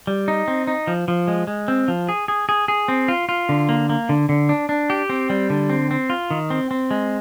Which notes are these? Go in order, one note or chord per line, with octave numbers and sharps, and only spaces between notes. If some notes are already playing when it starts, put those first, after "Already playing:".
G3
D#4
C4
D#4
F3
F3
G#3
G#3
C4
F3
G#4
G#4
G#4
G#4
C4
F4
F4
D3
A#3
A#3
D3
D3
D4
D4
G4
C4
G3
D3
C4
C4
F4
D#3
C4
C4
G#3